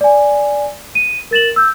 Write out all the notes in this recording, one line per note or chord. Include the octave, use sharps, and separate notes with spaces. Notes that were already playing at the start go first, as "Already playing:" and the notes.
D5 G#5
D#7
A#4 A6 E7 F#7
E6 G6